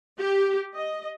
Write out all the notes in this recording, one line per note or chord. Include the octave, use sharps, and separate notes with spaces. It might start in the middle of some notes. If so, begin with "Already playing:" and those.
G4
D#5